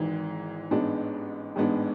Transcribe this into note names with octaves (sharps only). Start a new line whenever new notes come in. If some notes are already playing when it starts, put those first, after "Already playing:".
Already playing: G#1 G#2 E3
A1 G#2 G#3 B3 D4
A1 G#2 G#3 B3 D4